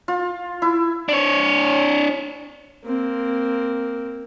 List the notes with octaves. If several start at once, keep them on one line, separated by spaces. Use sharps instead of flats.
F4
E4
D4 C#5
A#3 C4